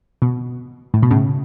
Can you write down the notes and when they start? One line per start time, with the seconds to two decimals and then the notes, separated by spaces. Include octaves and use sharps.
0.22 B2
0.94 A2
1.03 B2
1.11 A2 C#3